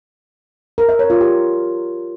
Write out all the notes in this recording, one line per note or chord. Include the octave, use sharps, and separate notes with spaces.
A#4
E5
C#5
F4
G4